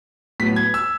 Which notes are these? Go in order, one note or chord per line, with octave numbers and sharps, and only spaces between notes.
A2 F#3 B3 B6
G#6
E6